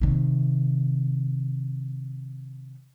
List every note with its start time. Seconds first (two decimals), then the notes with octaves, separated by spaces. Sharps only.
0.01 C3 D#3